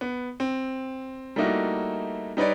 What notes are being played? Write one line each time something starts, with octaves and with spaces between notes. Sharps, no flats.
B3
C4
G3 A3 A#3 D#4 E4 F#4
G3 D#4 B4 C#5 D5